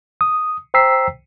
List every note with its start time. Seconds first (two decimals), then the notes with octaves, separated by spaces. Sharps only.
0.21 D#6
0.74 C5 G5 A#5 E6 B6 C7